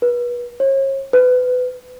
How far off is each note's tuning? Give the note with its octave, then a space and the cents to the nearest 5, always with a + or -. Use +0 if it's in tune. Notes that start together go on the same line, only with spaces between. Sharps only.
B4 -30
C#5 -40
B4 +25